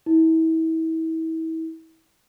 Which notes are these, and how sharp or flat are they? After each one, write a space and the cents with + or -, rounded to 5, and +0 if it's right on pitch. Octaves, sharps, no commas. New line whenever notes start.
E4 -35